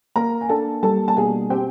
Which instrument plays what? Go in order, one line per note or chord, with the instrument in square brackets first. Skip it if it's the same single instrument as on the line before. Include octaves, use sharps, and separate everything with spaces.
[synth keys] A#3 [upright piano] A#4 A#5
[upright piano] G#5
[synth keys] D4 [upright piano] A4 A5
[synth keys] G3 [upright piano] A4 A5
[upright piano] A5
[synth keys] B2 [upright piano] G#4 G#5
[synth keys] C4 [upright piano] G4 G5